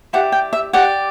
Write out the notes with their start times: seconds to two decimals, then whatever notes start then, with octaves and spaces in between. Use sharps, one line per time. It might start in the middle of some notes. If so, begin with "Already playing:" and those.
0.13 E4 G4 D5 F#5
0.32 G5
0.53 E5
0.73 G4 D5 F#5